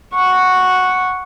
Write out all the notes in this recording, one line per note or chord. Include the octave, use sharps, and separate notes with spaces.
F#5 C#6